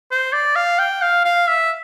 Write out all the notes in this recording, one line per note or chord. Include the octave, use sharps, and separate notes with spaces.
C5
D5
F5
G5
F5
F5
E5